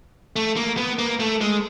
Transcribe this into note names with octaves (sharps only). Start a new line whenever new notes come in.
A3
A#3
B3
A#3
A3
G#3